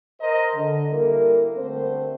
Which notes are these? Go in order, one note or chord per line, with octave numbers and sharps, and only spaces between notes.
A#4 C5 D#5 A#5
D3
G3 A#3 E4 A4 A#4
D3 G3 A3 C4 A#4 C5